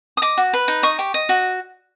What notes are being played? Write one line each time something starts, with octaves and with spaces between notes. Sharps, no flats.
D#6
D#5 D6
F#4
B4
D#4
D#5 C#6
G4
D#5
F#4